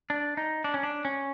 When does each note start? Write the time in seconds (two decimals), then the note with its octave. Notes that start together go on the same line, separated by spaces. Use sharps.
0.10 D4
0.37 D#4
0.64 D4
0.74 C#4
0.83 D4
1.05 C#4